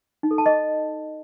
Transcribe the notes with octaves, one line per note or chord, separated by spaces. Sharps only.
D#4
A4
A5
D#5